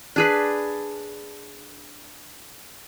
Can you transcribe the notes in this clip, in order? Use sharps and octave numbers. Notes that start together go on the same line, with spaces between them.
D4 G#4 B4